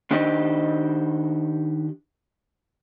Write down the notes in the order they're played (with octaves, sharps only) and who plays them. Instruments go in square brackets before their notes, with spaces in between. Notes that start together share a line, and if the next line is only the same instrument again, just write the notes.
[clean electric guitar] D#3 D4 D#4 G4 C5 D#5